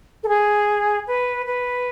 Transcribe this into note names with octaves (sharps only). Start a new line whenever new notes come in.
A4
G#4
B4
B4